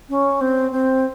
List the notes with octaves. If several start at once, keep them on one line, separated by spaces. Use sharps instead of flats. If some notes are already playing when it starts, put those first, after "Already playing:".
C#4
C4
C4